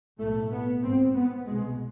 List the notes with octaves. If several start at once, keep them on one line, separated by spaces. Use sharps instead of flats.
B1 A2 A3
B3
G#1 G#2 C4
B3
C2 B2 G#3